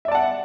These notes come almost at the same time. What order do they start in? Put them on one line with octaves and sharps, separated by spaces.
E5 D5 A5 F#5